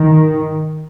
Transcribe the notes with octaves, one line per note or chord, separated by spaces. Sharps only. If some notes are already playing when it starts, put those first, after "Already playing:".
Already playing: D#3